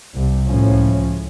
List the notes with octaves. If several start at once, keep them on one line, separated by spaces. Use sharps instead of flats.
C2
C#2 A2 F3 C#4